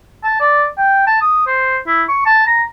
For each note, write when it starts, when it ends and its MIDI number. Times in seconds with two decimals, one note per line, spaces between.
0.24 0.40 81
0.40 0.66 74
0.78 1.03 79
1.07 1.17 81
1.21 1.42 87
1.47 1.77 72
1.87 2.03 64
2.09 2.22 85
2.26 2.45 81
2.47 2.63 82